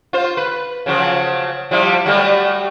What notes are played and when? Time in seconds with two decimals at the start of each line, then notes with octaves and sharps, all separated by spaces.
0.13 F4 C5
0.37 B4
0.86 C#3 F3 F#3
1.71 F3 G3 E4
2.06 F#3 G3 A3